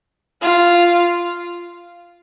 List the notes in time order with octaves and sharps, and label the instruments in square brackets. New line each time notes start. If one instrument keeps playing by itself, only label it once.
[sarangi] F4